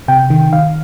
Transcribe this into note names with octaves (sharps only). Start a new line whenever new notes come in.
C3 G5
D#3
D#3 F5